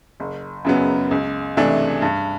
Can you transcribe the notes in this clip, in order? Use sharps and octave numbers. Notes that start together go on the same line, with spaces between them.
F#1
F#2 C#3 F#3 B3
C#2
C3 E3 A3 D4
G2